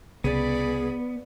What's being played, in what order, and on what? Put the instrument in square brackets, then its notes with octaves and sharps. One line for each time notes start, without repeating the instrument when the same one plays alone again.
[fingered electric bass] C2 C#3 [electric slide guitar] B3 [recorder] G#4 [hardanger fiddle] D5 B5